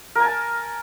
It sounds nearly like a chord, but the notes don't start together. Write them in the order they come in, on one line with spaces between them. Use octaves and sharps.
A#4 G#5 A5